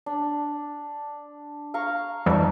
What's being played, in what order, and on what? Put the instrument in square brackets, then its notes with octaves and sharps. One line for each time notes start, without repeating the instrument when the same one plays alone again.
[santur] D4
F5 A#5 C#6
[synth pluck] F2 E3 G3 [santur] A3 D#4